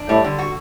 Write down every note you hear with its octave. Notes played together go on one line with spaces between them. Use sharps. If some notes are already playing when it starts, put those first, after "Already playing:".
Already playing: D4
A2 G3
D3
F#4